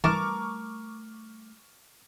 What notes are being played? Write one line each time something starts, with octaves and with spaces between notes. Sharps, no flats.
E3 G3 A3 A#4 A5 C#6 D6 F6